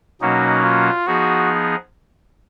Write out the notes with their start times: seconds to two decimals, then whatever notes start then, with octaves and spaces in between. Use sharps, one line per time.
0.21 B2 F#3 A#3 C#4 D#4 F#4
0.64 F4
1.07 F3 B3 D#4 F#4 G#4